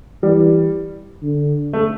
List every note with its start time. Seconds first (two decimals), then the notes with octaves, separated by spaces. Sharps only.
0.23 E3 G3
1.23 D3
1.73 A3